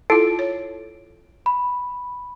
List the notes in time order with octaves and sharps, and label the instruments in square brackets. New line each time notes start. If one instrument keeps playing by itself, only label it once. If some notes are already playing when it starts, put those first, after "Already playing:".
[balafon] E4 F4 [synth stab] A4 [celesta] D7
[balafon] C#5
[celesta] B5